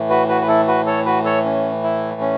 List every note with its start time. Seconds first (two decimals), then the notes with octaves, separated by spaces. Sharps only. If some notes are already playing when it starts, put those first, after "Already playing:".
Already playing: A2 E3 A3
0.10 F#4 B4
0.28 F#4 B4
0.42 B4
0.48 E4 A4
0.68 F#4 B4
0.86 A4 C#5
1.05 F#4 B4
1.25 A4 C#5
1.45 C#4
1.83 E4
2.21 C#4